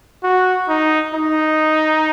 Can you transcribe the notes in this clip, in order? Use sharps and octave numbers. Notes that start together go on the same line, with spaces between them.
F#4
D#4
D#4